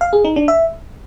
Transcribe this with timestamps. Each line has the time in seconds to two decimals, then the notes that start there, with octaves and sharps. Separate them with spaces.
0.01 F5
0.13 G#4
0.25 D#4
0.36 D4
0.48 E5